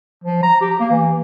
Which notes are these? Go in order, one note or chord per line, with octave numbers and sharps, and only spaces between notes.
F3
A#5
G4
A#3
E3